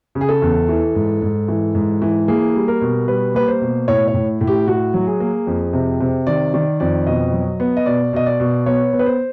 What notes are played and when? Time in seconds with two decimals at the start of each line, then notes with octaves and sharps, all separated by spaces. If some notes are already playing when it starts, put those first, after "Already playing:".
0.15 C#3
0.21 G#4
0.29 A4
0.42 E2
0.69 E3
0.95 G#2
1.22 G#2
1.48 E3
1.75 G#2
2.02 E3
2.28 A#3 G#4
2.55 G3
2.68 A#4
2.81 B2
3.08 G3 B4
3.35 A#3 B4
3.48 C5
3.61 B2
3.88 A2 C#5
4.08 C#5
4.14 A2
4.41 A2
4.47 G4
4.67 A2 F#4
4.94 F#3
5.07 G#4
5.20 A#3
5.47 F2
5.73 C3
6.01 C3
6.27 D#3 D5
6.54 D#3 D5
6.80 F2 D5
7.07 B2 D#5
7.33 F#3
7.60 B3
7.77 D#5
7.86 B2 D5
8.13 B2 D#5
8.26 D5
8.40 B2
8.66 B3 C#5
8.93 B3
8.99 B4
9.06 C5